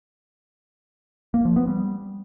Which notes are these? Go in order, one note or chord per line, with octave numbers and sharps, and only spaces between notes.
A#3
F3
B3
G3